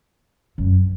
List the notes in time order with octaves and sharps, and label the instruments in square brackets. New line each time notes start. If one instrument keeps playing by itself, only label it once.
[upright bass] F#2